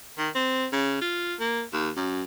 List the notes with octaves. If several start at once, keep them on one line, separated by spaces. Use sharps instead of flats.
D#3
C4
C#3
F4
A#3
D#2
F#2